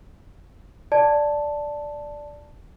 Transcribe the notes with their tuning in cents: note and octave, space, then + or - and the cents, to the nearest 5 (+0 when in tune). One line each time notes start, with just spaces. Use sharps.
D5 +0 A5 +0